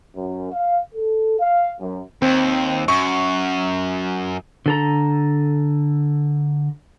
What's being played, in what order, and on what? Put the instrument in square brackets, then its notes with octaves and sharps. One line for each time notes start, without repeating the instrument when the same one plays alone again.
[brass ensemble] F#2
F5
A4
F5
F#2
[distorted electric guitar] D#2 [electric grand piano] C4
[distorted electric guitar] F#2 [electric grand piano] C#6
[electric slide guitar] D3 A4 A#5